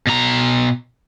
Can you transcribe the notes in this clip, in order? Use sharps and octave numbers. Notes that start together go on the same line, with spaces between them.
B2 A#5